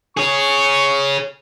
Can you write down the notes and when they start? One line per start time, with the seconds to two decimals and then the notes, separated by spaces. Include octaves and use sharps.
0.17 G#4 C#5 C#6